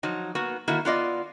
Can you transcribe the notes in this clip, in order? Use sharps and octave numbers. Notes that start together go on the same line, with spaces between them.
F3 F#3 D#4
A#3 B3 F#4
D#3 A3 A#3 E4 F#4
B3 F4 D5 D#5